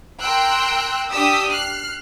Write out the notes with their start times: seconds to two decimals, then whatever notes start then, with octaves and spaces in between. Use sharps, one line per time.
0.21 A#4 G5 C6 E6 F#6
1.12 D4 G4 D#6 E6 B6
1.51 F6 F#6 C7